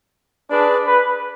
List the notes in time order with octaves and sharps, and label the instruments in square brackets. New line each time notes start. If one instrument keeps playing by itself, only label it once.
[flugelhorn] D4 [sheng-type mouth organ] G#4 B4 D5
[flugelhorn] B4